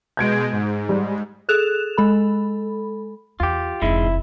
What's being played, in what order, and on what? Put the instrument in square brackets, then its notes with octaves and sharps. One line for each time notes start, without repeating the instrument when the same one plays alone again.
[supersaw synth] B2 G#3 [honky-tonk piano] G6 G#6 D7
[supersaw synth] G#2
[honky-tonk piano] G3
[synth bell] G#4 A4 F#6 E7 F7
G#3 A4 B5
[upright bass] E2 [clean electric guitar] F4 G4
[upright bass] F1 E2 [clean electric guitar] G#2 G#3 [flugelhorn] E4